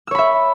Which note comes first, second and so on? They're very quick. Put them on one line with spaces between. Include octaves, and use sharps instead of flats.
E6 C#5 B5 E5